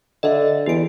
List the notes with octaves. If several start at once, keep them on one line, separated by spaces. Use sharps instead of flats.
D3 D#5 E5
E2 G4 D7